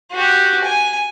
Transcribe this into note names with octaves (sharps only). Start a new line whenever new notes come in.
F#4 G4
G#5